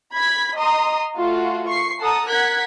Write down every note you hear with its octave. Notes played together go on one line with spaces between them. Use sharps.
B5 G#6 B6
D#5 A#5 C6 D#6
A3 F4 F#4
C#6 C7
A4 F#5 A5 A#5 D#6
A#4 F#5 F#6 G#6 B6